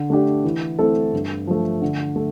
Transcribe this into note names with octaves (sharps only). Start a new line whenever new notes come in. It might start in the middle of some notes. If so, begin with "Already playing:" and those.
Already playing: D3
A3 D4 G4
E3
A3 C4 E4 A4
G2
F3 A3
D3
A3